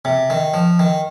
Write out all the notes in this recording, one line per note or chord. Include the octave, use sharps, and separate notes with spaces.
C3
D#3
F3
D#3